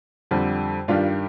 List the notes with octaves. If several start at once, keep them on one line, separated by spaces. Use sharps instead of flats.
F2 D3 G3
G2 D#3 G3 D4 F4